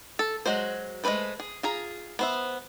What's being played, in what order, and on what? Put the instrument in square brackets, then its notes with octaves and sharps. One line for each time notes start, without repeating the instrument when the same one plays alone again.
[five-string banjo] A4
F#3 G#3 F#4 C5
G#3 A3 C#4 B4 C5
G#4
F4 G#4 A#5
B3 C5 E5